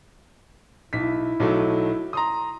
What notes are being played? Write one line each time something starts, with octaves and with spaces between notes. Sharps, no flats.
B1 E4 B6
B1 F#3 A3
A#5 C6 D#6